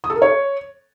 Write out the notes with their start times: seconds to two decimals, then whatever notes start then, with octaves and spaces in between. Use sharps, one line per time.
0.04 D#6
0.10 A4
0.16 A#4
0.22 C#5